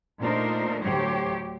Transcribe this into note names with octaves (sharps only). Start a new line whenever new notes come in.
A#2 A3 D4 D#4 A#4 C5
D2 A2 F#3 G4 C5 C#5